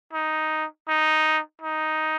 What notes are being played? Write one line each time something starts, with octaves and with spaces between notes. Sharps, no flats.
D#4
D#4
D#4